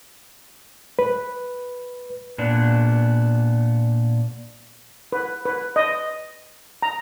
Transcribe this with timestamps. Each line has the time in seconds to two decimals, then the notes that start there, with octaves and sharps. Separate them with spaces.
0.99 B4
2.38 A#2 B3 D4
5.12 B4
5.46 B4
5.76 D#5
6.82 A#5